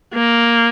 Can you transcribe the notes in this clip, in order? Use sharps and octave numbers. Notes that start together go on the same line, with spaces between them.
A#3